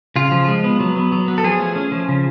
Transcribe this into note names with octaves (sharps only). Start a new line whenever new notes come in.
C#3 F4
F3
G#3
B3
F#3
B3
F#3
B3
A4
F3 G#4
A3
C#4
F3
C#3